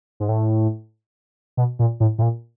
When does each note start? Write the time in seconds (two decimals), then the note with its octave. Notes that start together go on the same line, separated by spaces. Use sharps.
0.20 G#2
0.29 A2
1.57 B2
1.79 A#2
2.00 A2
2.18 A2
2.22 A#2